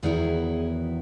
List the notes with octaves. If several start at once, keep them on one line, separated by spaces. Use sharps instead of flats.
E2 D#3 F#3 B3 E4 G#4